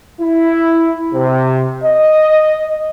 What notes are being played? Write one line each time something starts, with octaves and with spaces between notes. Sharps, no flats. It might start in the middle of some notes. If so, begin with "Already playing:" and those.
E4
C3
D#5